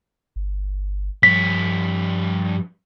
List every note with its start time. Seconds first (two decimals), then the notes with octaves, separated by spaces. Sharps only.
0.36 G1
1.23 G2 F3 C#5 B6